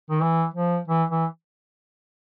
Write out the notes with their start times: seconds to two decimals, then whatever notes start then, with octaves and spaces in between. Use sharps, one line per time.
0.10 D#3
0.21 E3
0.54 F3
0.88 E3
1.10 E3